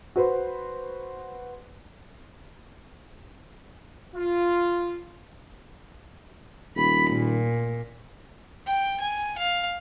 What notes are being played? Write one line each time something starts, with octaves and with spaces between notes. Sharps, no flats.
F#4 B4 C5
F4
D#1 B5
A#2
G5
G#5
F5